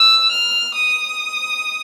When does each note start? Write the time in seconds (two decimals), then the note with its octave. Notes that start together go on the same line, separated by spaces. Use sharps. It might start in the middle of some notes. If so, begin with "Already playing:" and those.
Already playing: E6
0.32 F6
0.74 D#6